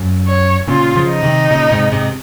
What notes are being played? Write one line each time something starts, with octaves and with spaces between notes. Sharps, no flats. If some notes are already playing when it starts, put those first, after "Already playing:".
Already playing: F#2
C#5
A#2 C#3 F4
C#3 F3
D#4
C3 D#3
A#2 C#3
G#2 C3
G#2 C3